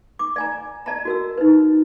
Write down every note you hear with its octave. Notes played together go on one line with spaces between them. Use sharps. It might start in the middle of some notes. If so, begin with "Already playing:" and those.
D6
D5 G#5 A#5
D5 D#5 A5 A#5
F#4 A#4 E6
D#4 B4